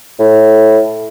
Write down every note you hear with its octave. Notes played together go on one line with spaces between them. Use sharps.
A2